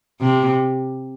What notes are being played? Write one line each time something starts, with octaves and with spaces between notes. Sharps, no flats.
C3